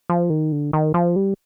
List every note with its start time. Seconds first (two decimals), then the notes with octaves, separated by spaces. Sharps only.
0.10 F3
0.30 D#3
0.52 D3
0.73 D#3
0.94 F3
1.16 G3